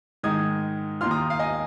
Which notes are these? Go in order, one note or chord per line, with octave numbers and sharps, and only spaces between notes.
G#2 D#3 G#3 D#4 D#6 G#6
D#2 D#3 A#3 F4 C6 F6
A#5 D#6
F5
D#5 G#5